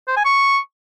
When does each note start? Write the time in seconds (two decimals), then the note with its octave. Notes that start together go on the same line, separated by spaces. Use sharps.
0.08 C5
0.17 G#5
0.25 C#6